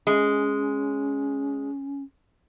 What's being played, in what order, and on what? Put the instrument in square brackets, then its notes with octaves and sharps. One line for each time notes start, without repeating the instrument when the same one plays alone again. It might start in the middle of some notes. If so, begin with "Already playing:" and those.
[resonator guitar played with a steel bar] G#3 [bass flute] C#4